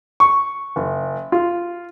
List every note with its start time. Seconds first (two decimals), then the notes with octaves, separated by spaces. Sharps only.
0.20 C#6
0.76 F#1
1.32 F4